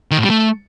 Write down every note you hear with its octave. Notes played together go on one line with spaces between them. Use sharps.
D#3
A2
G3
A3